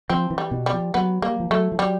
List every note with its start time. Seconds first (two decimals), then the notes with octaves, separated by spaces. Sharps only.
0.10 F3 C4
0.30 E3
0.38 G3
0.51 B2
0.66 G3
0.73 F3
0.94 F#3 B3
1.22 G3 A#3
1.40 F3
1.51 F#3 A3
1.72 F3
1.79 F#3 G3